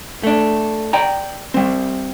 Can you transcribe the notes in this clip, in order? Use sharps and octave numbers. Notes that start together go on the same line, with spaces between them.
A3 D4
D5 G5 A#5
G3 C4